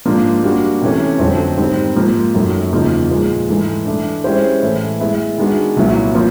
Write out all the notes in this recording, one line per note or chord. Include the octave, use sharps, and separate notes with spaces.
G#2 F3 A#3 D4
G3 A#3 D4 F#4
C3 E3 A3 C#4
F2 D3 F#3 A3 C4
G#2 D#3 G3 C4
G#2 F3 A#3
F#2 D#3 F#3 A3
E2 C#3 F3 A#3 D#4
A#2 F3 G#3
G#2 E3 A3
E3 A3 D4
G#3 C#4 E4 G4 C5
A2 E3 A3
G#3 B3 E4
D#3 G#3 B3 D4 F#4
C2 A#2 F#3 B3 E4
F3 A#3